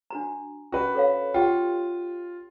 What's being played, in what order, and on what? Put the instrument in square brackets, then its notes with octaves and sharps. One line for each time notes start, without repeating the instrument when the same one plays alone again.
[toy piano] D4 F#4 A#5
[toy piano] C#4 [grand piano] F#4 B4
[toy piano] A4 C#5 F5
[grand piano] F4 [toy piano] G4 F#5 G5